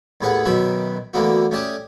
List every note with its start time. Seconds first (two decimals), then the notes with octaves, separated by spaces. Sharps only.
0.21 D#2 A2 B3 G#4 B4 F#5
0.45 F#2 B2 D#3 F#4 B4 E5
1.14 D2 D3 E3 A#3 B3 F#4
1.51 A3 C#4 G4 D5 A5 D#6